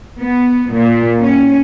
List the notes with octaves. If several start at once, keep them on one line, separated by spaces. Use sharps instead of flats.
B3
A#2
C#4